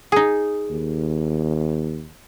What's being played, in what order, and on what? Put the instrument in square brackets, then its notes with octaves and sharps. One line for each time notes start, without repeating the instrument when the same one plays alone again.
[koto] D#4 G#4
[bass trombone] D#2